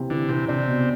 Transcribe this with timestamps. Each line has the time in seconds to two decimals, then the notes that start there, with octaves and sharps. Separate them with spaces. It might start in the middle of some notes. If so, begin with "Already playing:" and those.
Already playing: C3 E3
0.10 D3 E3
0.29 C3 E3
0.48 C3 D4
0.67 B2